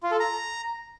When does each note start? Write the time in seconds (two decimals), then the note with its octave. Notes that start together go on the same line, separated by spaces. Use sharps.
0.03 F4
0.11 A4
0.20 A#5